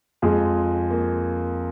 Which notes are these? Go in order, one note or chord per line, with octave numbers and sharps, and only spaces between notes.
F2 F3 G#3 F4 G#4
A#3